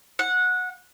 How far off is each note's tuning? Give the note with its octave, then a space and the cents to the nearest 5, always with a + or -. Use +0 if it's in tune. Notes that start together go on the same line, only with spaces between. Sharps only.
F#5 -15